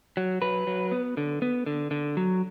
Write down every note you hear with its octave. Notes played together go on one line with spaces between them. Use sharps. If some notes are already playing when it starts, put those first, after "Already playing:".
F#3
F#3 B4
F#3
B3
D3
B3
D3
D3
F#3